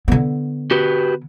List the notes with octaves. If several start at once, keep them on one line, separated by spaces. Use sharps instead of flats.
D3 B3
F#4 G4 B4